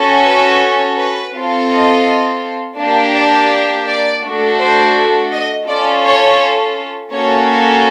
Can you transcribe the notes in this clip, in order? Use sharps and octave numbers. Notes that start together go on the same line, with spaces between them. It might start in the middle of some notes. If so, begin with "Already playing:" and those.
Already playing: C#4 F#4 A4
B4
B4
C4 F4 A4
D#5
A#3 D4 G4
D5
D5
A3 D4 F#4 A4
C5
D#5
C#4 F4 A4 D5
C#5
A#3 C#4 F#4 A4 C#5